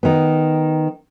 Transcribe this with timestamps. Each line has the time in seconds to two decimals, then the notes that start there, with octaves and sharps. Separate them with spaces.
0.03 D#3 B3